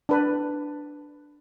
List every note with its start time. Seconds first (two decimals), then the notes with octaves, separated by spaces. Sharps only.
0.09 D4 B4